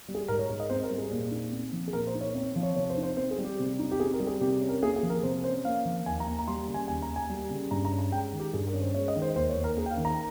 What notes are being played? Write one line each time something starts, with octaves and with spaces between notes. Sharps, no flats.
G3
G#4
G#2 A#4
C#5
G#2
D#5
C4 C5
A#4
G3
G#4
A#2
D#4
C4
F3
G#4
A#2 A#4
C5
D#4
C#5
C4 C#5
F3
C#5
C3 C#5
C5
D#4
C5
C4 C5
G#4
G3
G4
C3
D#4
G4
C4 G#4
A#4
G3
G#4
C3 G4
C#4
A#4
A#3 G#4
G#4
F3
A#4
C3 C5
C#4 C5
A#3 F5
F3
D#2 G#5
A#5
A#3
A#5
G3 C6
C#3
G#5
D#2 G#5
A#5
A#3
G#5
G3
C#3
G2 A#5
A#5
C#4
A#5
G#3 G5
D#3
G4
G2 G#4
A#4
C#4
C5
G#3 C#5
D#5
D#3
C5
D#2 C5
C#5
D#2
A#4
A#3 G#4
G5
F5
D#3
A#5